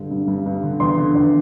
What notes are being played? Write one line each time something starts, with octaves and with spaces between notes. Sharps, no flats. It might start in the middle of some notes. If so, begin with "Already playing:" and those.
Already playing: G2 D3
G2
G2
G2
D3
E2 C6
D3
E2